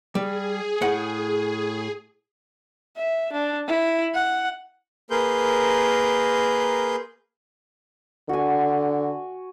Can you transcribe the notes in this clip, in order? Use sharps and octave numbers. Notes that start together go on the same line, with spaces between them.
G3 G#4
A2 F#5
E5
D4
E4
F#5
A#3 G#4 A#4 B4 C6 G6
D3 F#4 G#5